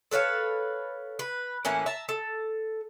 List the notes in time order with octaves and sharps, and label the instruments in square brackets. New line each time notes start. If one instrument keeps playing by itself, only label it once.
[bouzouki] A4 B4 C#5 F5
B4
A2 E3 A#3 C#4
E5 A5 A#5
A4